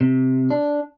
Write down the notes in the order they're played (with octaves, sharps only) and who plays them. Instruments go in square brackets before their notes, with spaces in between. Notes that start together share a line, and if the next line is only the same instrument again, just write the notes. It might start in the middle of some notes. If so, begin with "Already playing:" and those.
[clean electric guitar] C3
D4